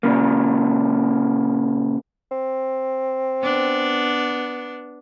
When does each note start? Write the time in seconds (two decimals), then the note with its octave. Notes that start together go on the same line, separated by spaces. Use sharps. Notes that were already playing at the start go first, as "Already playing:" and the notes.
0.03 A#2 C#3 A#3
2.31 C4
3.42 B3 D4